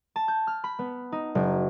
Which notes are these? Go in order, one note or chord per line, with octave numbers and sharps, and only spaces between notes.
A5
G6
F6
B5
B3
D#4
F#1